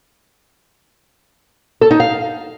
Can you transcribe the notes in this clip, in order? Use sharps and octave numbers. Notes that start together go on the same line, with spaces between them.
A4
D#4
F5